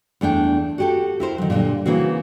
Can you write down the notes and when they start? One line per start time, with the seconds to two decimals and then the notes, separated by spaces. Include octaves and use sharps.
0.21 E2 A3 D4 G5
0.78 F#4 G4 A4
1.20 E4 A#4 C5
1.38 D#3 F#3
1.50 A#2 D3 G3
1.86 C#3 E3 A#3 C4 F#4